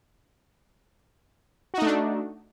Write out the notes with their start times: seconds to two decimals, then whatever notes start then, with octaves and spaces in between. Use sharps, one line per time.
1.74 F#4
1.78 D#4
1.82 A3
1.86 D4